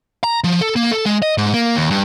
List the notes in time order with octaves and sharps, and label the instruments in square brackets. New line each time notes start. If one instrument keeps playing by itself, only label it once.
[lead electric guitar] A#5
F3
A4
A#3
A4
G#3
D#5
G#2
A#3
D#2
G2